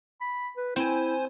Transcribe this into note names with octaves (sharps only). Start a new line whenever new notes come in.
B5
B4
C4 E4 C5 G#5